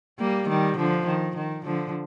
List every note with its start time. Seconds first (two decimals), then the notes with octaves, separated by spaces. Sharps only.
0.19 G3 A#3
0.48 D#3 G3
0.77 D3 F3
1.06 D#3
1.36 D#3
1.65 D3 F3